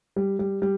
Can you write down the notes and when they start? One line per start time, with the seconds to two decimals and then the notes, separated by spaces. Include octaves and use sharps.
0.16 G3
0.39 G3
0.62 G3